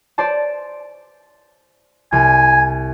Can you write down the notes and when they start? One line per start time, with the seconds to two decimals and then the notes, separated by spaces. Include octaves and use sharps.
0.18 C5 D5 A5
2.12 C2 G#5